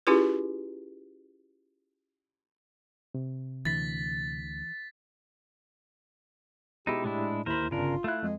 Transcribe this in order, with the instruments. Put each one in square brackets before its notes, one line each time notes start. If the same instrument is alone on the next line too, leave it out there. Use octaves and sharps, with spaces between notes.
[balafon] C#4 E4 F4 G4 G#4 B4
[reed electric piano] C3
[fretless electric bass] D2 D3 [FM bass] E3 [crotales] A6 B6
[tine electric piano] B2 G#3 [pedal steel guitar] D#4 E4 [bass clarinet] G4
[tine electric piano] A2 [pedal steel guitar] G#3 D4 E4
[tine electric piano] D#2 B5 [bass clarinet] E4 [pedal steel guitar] A#4 C5
[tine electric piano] G1 D4 [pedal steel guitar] C#3 A#4 [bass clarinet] F4
[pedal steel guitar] A3 F#6 [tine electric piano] E4 F5
[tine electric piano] F2 [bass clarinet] G#3